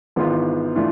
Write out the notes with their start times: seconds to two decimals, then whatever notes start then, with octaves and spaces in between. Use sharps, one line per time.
0.16 G#1 G#2 E3 B3 F4
0.75 E3 A3 D4 F4